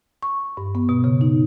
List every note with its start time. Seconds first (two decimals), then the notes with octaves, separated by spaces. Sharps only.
0.22 C#6
0.57 G2
0.75 B3
0.89 B2
1.04 C#3
1.21 D#4